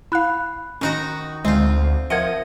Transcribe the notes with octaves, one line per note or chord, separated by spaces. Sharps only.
E4 F5 B5 F#6
D#3 C#4 D#4 F#4
D2 G#3 C4 F4
F3 A#4 D#5 E5 F#5 G#6 C#7